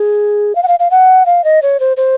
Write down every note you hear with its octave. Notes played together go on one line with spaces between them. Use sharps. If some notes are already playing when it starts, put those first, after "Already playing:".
Already playing: G#4
F5
F#5
F5
F5
F#5
F5
D#5
C#5
C5
C5